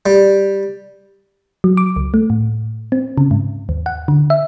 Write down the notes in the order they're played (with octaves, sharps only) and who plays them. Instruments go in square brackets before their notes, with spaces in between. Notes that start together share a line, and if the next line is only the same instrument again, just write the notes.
[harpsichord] G3
[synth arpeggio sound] F#3
D6
C#2
A3
A2
C4
C#3
G#2
D#2
F#5
D3
E5